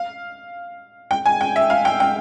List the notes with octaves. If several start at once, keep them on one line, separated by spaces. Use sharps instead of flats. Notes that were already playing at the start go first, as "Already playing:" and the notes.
Already playing: F5
G5
G#5
G5
E5
F5
G5
G5